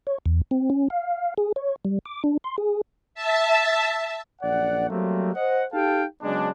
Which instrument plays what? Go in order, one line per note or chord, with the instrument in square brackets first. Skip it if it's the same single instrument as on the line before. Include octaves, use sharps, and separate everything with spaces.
[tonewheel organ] C#5
E2
C4
C#4
F5
G#4
C#5
G3
D6
D4
C6
G#4
[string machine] E5 A5
[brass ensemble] A#1 F#2 D5 F#5
F#3 G3 A3 A#3 C4
C5 D#5 F#5
D#4 G4 A4 F5 G5 A5
C#3 F#3 G#3 B3 D4